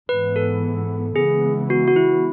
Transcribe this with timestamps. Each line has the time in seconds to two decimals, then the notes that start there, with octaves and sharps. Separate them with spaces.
0.09 G#2 E3 B3 B4
0.36 A4
1.16 C#3 E3 G#3 B3 G#4
1.70 F#4
1.87 F#4
1.96 E4